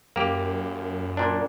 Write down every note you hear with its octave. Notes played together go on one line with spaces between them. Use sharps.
F#2 A#3 G4
A#2 D4